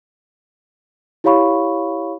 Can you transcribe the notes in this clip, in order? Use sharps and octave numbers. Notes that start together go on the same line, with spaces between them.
E4 G4 C#5 F5 B5 C#6